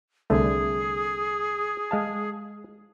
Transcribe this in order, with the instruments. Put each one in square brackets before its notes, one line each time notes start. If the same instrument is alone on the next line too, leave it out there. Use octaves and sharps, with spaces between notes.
[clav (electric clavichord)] C2 D3 A3 [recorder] G#4
[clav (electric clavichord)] G#3 F5 A5